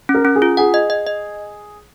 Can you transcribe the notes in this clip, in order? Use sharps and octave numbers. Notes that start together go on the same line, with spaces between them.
C#4
A#4
C#4
G#4
F4
G#4 F#5
D#5
D#5
D#5